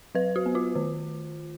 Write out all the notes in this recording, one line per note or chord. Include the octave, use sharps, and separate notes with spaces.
F#3 B4
F#4
B3
F4
D#3